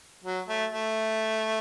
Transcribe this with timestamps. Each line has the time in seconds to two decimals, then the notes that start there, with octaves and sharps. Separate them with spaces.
0.24 F#3
0.48 A3
0.72 A3